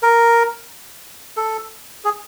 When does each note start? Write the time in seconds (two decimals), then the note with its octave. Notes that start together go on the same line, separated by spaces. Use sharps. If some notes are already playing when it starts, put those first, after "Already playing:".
0.03 A#4
1.37 A4
2.04 G#4